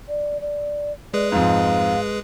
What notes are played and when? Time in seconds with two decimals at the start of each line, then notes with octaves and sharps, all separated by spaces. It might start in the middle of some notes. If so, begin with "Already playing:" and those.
0.09 D5
0.41 D5
1.14 G#3 G#4 B4 D5
1.32 F2 G#2 F5